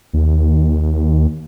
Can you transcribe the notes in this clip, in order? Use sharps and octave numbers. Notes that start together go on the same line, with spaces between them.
D#2